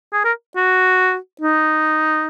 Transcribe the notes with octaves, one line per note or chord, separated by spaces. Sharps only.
G#4
A#4
F#4
D#4